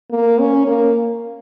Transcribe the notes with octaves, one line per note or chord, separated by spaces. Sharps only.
A#3
C#4
A#3